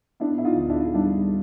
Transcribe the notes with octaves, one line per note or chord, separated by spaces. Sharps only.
B3 D4 E4
E4
D#4 F4
D2
D4 E4
G3 D4 E4